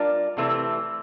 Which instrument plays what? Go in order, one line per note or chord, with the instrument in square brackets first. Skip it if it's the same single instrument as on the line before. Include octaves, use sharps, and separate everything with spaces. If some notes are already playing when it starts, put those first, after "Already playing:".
Already playing: [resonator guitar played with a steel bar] G3 D4 F4 A#4 D5
C3 E3 A3 C4